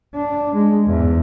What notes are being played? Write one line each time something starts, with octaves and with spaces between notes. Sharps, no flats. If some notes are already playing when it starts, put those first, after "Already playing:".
D4
G#3
E2 G#2